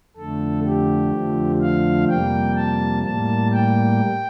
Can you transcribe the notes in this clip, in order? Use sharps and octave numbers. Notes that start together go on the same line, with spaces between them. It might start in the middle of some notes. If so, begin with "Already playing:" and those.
F2 D3 A3 A4
G4
F2 D3 F3 A3
F5
F2 C3 G3 A#3 G5
A5
A2 G3 A#3 A5
G5